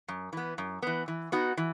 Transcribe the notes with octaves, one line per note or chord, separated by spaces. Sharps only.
F#2
E3 B3
F#2
E3 B3
E3
B3 D#4 F#4
E3